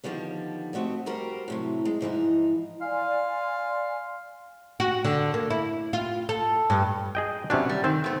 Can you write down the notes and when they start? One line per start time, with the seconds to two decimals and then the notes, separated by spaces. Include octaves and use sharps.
0.04 D3 D#3 F3 G3 B3
0.73 A3 C4 F#4 G4 D#5
1.06 G3 F#4 G4 A#4 C5
1.48 A2 C3 F#3
1.85 G#3
2.01 G#2 E3 F3 D#4
2.81 D5 F5 G#5 C6
4.80 F#4
5.05 D3
5.34 A#3
5.50 E4
5.93 F4
6.29 A4
6.70 G2
7.15 G#4 D#5 G5
7.50 C3 F#3 B3 C#4 D4
7.69 G3
7.84 D#3 C4 C5
8.04 A3 B3